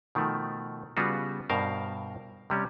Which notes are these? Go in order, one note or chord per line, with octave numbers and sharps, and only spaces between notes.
B2 D#3 F3 A3
C#3 G3 B3 F4 F#4
G2 B2 A#4 C5 F5
C3 G3 C#4